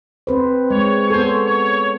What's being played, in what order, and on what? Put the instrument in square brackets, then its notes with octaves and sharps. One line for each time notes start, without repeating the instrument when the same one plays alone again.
[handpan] C4 B4 C5
[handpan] G#3 [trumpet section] C#5
[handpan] B3 A4 [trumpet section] C5 C#5 G#5
[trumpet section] C#5